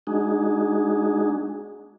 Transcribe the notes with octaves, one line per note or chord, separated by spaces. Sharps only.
G#3 D4 D#4 F#4 G#4